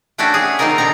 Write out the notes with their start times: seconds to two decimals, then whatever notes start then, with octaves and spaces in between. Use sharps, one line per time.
0.18 A3 C#4 D4 E4 F#4 G4
0.34 G#4
0.59 D#3 A#3 C4 D#4 F4 A#4
0.78 B2 D3 C4 A#5